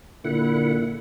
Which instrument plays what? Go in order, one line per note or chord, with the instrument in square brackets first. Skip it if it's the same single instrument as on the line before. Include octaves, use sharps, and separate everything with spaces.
[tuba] A#2 [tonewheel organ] D3 E4 F#5